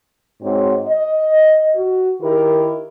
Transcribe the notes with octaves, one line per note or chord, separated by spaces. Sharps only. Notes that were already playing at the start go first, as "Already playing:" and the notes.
G#2 C4 F#4 C#5
D#5
F#4
D#3 E4 G4 A#4